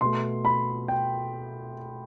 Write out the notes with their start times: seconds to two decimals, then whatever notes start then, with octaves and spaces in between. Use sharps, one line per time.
0.01 B2 A3 C6
0.45 B5
0.88 G5